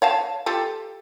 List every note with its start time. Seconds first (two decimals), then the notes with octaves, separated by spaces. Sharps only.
0.02 C#5 F5 A5
0.46 F4 G4 A4